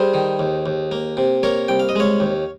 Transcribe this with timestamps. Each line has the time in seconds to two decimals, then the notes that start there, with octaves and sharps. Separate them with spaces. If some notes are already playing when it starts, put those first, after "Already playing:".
Already playing: G3 G#4 C5
0.14 D#3
0.39 D#2
0.66 D#2
0.91 A#3
1.17 C3
1.43 A#3 A#4 C#5
1.68 C2 G5
1.79 F5
1.89 D#5
1.96 G#3 C#5 F5
2.20 D#2